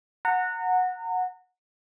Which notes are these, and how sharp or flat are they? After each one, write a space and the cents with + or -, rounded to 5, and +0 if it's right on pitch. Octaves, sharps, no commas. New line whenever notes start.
F#5 -10 A#5 -30